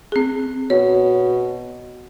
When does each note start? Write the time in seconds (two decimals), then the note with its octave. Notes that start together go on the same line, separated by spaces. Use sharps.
0.12 C4 G#4
0.70 B2 C#5